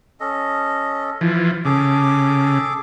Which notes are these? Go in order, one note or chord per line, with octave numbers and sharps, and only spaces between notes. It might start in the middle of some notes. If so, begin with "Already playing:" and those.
C#4 A4 D#5
E3 F3
C#3 G#4 A4 D6